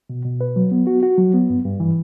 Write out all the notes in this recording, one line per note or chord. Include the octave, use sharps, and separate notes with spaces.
B2
B2
B4
F#3
B3
F#4
F#4
F#3
B3
G2
G2
E3